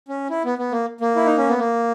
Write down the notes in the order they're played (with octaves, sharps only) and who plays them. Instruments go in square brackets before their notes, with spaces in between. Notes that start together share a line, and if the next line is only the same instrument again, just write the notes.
[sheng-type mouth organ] C#4
E4
B3
B3
A#3
A#3
E4
D#4
C#4
B3
A#3